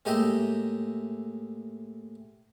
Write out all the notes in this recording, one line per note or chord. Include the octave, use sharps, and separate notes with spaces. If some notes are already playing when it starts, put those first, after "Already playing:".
A2 G#3 A#3 G4 D#5 E5